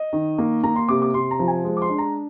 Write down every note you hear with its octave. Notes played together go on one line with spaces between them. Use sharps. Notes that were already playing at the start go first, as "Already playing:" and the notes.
Already playing: D#5
D#3
A#3
A#3 A#5
C6
C3 D6
D6
C3 C6
A#5
F3
G#5
G#3
D6
C6
D4
A#5